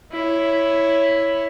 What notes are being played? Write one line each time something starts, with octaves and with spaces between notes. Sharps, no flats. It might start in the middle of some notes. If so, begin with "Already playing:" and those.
E4 C#5